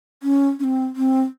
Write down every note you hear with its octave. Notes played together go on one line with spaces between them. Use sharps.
C#4
C#4
C4
C4